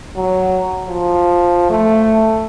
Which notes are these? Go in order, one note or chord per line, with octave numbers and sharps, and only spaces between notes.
F#3
F3
A3